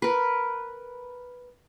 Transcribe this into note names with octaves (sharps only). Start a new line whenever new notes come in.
A#4 B4